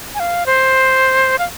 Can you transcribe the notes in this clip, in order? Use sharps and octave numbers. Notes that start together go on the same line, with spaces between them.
G#5
F5
C5
F5